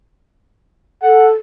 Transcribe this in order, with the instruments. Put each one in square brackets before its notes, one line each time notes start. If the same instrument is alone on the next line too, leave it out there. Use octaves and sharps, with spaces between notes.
[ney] A4 [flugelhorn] F#5